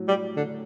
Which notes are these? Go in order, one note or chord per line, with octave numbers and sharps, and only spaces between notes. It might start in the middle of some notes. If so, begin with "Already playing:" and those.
Already playing: A2 F#3
G3
D3